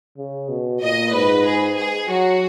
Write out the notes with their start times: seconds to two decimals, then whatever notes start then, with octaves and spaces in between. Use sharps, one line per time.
0.18 C#3
0.49 B2
0.82 A#2 D#5
1.13 G#2 B4
1.45 G#4
1.77 G#4
2.09 F#3 F#4